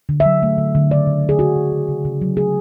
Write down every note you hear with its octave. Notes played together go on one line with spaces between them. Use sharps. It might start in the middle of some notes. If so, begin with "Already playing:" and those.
D3
E5
F#3
A3
D3
D3
C#3 D5
C#3
F#3
G#4
A3 F#4
C#3
C#3
C#3
C#3
F#3
A3 G#4